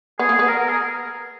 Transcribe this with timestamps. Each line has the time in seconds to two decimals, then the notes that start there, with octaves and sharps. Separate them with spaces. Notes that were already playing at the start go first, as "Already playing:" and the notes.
0.19 B3 G#4
0.29 A#3
0.34 G#4
0.39 B3
0.48 A#4
0.59 A#4
0.69 G#4